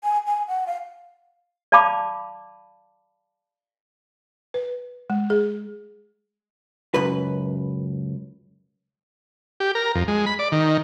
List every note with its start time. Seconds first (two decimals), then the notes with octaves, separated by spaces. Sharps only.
0.04 G#5
0.27 G#5
0.48 F#5
0.67 F5
1.72 D5 F5 A5 B5 D6
4.54 B4
5.10 G#3
5.30 G#4
6.94 C#2 F#2 B4
9.60 G4
9.75 A#4
9.95 F2
10.08 G#3
10.26 B5
10.39 D5
10.52 D#3